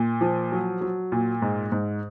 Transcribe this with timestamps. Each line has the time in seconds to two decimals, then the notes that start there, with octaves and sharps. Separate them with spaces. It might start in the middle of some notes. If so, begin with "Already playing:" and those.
Already playing: A#2
0.21 F3
0.52 F#3
0.81 F#3
1.12 A#2
1.42 G#2
1.72 G#2